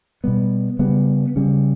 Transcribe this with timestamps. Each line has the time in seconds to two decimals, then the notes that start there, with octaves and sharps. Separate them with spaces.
0.24 B2 G3 B3
0.79 C#3 G3 B3
1.36 C#3 G3 C#4